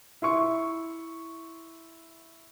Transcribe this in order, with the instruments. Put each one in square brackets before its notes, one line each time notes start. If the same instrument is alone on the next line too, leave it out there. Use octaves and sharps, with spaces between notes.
[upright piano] E4 C6 C#6